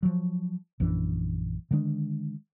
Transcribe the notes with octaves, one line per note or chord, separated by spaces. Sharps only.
F3 F#3
A#1 F#2 E3 D4
D3 D#3 G#3 D4